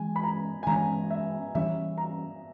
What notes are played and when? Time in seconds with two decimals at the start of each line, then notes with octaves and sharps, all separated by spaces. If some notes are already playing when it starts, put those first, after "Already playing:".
Already playing: E3 G#3 C#4 G#5
0.16 B5
0.24 A#5
0.63 G#5
0.67 E3 G#3 C#4 A#5
1.11 E5
1.55 E3 G3 C#4 E5
1.98 A#5